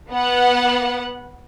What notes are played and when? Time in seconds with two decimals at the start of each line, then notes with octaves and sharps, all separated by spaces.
0.11 B3 F#5